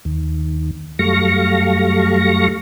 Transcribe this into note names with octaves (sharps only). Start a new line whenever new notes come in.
D#2
F#2 G3 A3 F5 C#6 A#6